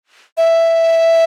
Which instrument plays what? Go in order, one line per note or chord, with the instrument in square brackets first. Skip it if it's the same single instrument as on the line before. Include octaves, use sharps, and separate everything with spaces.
[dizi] E5